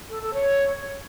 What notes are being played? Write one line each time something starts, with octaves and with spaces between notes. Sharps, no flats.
A4
A4
C#5